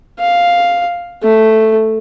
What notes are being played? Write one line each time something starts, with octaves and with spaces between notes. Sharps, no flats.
F5
A3